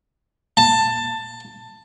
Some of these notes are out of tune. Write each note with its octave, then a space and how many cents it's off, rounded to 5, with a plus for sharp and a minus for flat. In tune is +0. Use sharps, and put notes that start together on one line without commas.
A5 +15